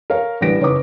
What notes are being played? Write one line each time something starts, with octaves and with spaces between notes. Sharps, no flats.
A#4 C#5 F5
A1 D3 G3 B4 A#6 D7
F#1 C#4 D#4 B4 D6